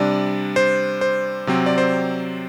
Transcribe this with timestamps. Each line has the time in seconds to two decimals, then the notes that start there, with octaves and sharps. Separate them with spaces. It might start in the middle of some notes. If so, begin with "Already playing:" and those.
Already playing: C3 G3 D4 D5
0.56 C5
1.01 C5
1.47 C3 F#3 C4
1.66 D5
1.78 C5